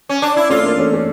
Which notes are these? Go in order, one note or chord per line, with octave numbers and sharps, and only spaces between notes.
C#4
D4
E4
A3 C#4 F4
A#3 D4
A3 C#4
A3 C#4